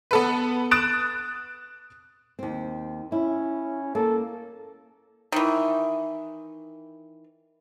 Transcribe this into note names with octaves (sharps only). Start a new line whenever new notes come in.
B3 A4 B4
D#6 F#6 A6 D7 E7
D#2 C4
C#4 E4
A#3 A4
D#3 E3